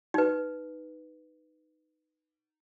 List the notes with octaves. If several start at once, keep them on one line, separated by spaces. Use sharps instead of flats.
D#4 B4